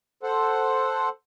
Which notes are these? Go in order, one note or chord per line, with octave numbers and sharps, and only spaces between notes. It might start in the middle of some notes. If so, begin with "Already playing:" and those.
A4 C5 F#5